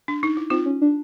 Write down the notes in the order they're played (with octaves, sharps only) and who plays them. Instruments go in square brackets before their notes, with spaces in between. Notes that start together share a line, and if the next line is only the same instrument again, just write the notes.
[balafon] D4
D#4
E4
[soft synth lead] C4 [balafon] D#4 F4
[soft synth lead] C#4
D4